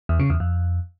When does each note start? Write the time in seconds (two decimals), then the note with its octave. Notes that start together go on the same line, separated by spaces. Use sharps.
0.09 E2
0.20 C#3
0.30 E2
0.40 F2